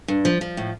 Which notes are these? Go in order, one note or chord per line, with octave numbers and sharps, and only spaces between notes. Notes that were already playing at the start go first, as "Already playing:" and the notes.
G2
F3
F3
A2